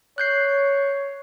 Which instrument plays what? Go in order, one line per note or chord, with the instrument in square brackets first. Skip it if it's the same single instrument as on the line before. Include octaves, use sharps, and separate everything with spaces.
[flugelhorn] C#5 [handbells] F#6 G6 C7